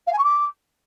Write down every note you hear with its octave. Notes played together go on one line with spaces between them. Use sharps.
F5
G#5
C#6
D6